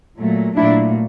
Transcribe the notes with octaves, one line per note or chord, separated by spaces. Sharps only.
A#2 F#3 A3
A#2 F#3 A3 D4 E4